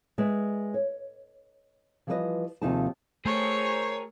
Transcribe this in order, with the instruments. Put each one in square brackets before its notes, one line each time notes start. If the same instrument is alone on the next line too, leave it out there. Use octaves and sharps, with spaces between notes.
[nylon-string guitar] G#3 B4 D5 E5
C#5
E3 F3 G3 G#4 B4 D#5
D#2 C3 F3 D#4 G#4 A5
[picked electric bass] A3 [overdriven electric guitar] G#4 A#4 [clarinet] C5 [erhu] C#5